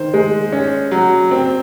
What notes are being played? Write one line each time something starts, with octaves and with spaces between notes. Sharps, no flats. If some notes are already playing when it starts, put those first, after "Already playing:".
Already playing: D#3 C5
G#3
C#4
F#3
C4